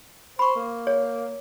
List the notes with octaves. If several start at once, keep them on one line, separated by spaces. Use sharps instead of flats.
C5 B5 C#6
A#3
C#5